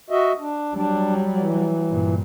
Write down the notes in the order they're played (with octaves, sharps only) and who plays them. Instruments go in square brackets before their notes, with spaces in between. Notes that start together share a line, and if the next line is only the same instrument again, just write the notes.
[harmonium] F#4 D#5 E5
D4
[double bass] F#3 G3 [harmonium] D4
[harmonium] E3
[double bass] G2 A#2